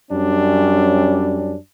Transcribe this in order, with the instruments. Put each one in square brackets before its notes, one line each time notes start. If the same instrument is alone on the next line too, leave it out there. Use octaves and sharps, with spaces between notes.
[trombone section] F#2 G3 C#4 D4